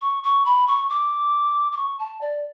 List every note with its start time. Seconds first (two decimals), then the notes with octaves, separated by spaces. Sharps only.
0.01 C#6
0.23 C#6
0.45 B5
0.67 C#6
0.90 D6
1.72 D6
1.77 C#6
1.99 A5
2.21 D5